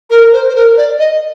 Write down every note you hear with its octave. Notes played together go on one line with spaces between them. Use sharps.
A#4
C5
C5
A#4
D5
D#5